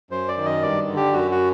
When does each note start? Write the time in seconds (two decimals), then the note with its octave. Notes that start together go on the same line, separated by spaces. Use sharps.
0.10 F#2 C5
0.28 D5
0.37 D#3
0.45 D#5
0.62 G2 D5
0.87 D3
0.97 G4
1.13 F#2 F#4
1.31 F#4